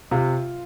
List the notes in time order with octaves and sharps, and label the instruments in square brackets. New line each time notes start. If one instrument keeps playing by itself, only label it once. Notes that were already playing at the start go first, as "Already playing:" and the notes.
[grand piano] C3 [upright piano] F4